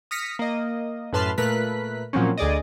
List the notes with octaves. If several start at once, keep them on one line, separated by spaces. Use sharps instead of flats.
D#6 F6 A#6 B6 C#7
A#3 D#5
F#2 A2 B4 A5 C6 F6
A#2 A3 A#4 B4 F#6 B6
A#2 F3 F#3 A#3 C4 C#4
D2 G#4 D5 D#5